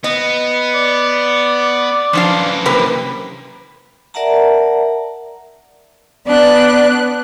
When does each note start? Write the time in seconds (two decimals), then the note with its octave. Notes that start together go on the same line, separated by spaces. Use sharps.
0.04 B3 D#5
0.75 D5
2.13 F#2 E3 F3 D4 F5
2.66 C3 A#3 B4
4.14 A#4 D5 E5 F#5 A5 A#5
6.26 B3 D4 D5 F#6